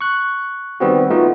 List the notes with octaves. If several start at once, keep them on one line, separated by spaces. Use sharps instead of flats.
C#6 F#6
D#3 G3 B3 C4 F#4
A3 B3 D#4 F4 F#4